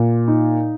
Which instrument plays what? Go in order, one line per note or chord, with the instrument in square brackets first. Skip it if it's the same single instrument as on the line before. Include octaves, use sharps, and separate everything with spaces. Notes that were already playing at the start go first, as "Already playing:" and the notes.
Already playing: [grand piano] A#2
D#4